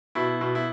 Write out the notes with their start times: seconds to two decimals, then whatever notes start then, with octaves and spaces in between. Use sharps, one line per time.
0.15 B2 E4
0.41 B2
0.55 E4